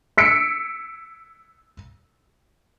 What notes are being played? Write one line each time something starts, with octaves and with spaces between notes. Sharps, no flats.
E6 B6 C#7 D7